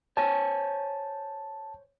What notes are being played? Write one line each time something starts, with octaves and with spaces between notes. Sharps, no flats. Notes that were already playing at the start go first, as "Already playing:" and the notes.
C5 C#5 G#5 A5